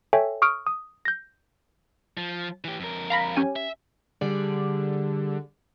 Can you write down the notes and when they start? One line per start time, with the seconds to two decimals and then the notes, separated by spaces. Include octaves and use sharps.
0.13 A4 C#5 E5 G5 G#5
0.42 C#6 D#6 F6 D7
0.67 D#6
1.05 G6 A#6
2.17 F3
2.64 E3 G4
2.80 F2 A#4
3.10 F5 A#5 B5
3.36 C#4 G4 G#5
3.56 E5
4.21 D3 G3 G#4 D5